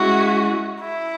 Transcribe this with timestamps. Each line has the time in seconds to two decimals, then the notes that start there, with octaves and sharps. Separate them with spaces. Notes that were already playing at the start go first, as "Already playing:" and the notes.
Already playing: G#3 C#4 E4 F#4
0.81 E4